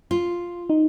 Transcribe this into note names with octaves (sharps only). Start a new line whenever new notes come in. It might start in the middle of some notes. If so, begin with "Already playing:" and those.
F4
D#4